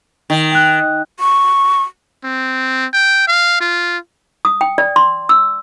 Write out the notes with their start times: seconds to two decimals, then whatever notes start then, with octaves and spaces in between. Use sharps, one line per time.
0.30 D#3
0.52 G5 F#6
1.20 C#6
2.24 C4
2.93 G5
3.28 F5
3.60 F4
4.45 D#6
4.61 G5
4.78 D5
4.96 C6
5.29 E6